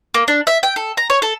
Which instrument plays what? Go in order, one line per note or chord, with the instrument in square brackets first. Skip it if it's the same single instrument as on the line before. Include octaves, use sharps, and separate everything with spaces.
[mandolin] A#3
D4
E5
G5
A4
A#5
C#5
A4